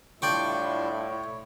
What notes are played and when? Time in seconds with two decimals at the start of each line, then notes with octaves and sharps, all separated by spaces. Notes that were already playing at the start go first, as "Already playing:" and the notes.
0.22 A2 G3 D4 E4 F4 D5 G5 C#6
1.10 C#5